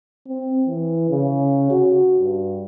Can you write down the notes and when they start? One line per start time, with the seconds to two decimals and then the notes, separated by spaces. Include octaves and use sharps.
0.27 C4
0.67 E3
1.10 C#3
1.71 F#4
2.20 G2